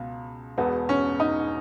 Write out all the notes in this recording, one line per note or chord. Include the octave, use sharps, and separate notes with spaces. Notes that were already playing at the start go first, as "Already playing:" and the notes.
Already playing: C#2 B2
E1 E2 B2 B3
C#4
D#4